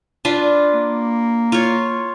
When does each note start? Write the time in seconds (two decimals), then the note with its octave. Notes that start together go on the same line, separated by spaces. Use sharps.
0.25 D4 F4 B4
0.73 A#3
1.52 F4 C#5